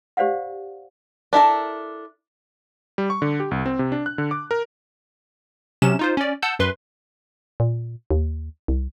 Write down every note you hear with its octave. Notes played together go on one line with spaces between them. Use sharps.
G4 C5 D5 F5 F#5
D4 E4 A4 A#4
G3
C#6
D3
G4
C2
C4
C3
D4
F#6
D3
D6
A#4
C3 F#3 C#4 E7
D#4 F4 C5
C#4 D5
F#5 A5 E6 G6
F#2 B4 C6
A#2
D#2
C2